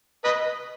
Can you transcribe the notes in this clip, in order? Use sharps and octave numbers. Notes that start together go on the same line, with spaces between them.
B4 D#5